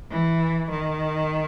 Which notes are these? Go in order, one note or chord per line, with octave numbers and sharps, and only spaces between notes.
E3
D#3